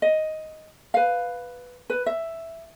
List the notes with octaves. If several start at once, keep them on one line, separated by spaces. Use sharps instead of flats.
D#5
B4 F5
B4
E5